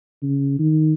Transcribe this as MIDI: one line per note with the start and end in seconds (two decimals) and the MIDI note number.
0.23 0.58 49
0.59 0.94 51